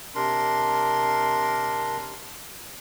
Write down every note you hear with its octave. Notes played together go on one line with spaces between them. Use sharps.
C3 D4 A#4 C6